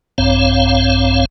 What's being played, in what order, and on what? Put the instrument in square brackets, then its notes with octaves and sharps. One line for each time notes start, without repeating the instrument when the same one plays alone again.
[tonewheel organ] A#1 G2 C4 C#5 F5